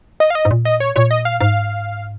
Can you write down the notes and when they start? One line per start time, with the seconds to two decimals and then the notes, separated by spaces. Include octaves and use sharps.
0.20 D#5
0.30 F5
0.35 D#5
0.45 G#2
0.51 A#2
0.65 D#5
0.80 C#5
0.96 A#2 C#5
1.11 D#5
1.25 F5
1.41 G#2 F5